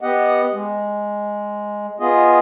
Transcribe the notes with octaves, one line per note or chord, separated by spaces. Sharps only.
B3 G4 D#5 F#5
G#3
B3 F4 G#4 D#5